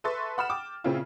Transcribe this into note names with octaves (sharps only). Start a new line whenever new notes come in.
A4 B4 E5 C6 C#6 A6
F#5 B5 F6 E7
G5 D6
A#2 C#3 C4 C#4 E4 F4